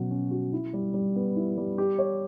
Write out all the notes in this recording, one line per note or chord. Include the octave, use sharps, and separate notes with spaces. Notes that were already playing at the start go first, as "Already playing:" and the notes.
Already playing: B2 F#3 C#4 F#4
C#4
F#4
E4
G3
G3
B3
E4
G3
G4
C#5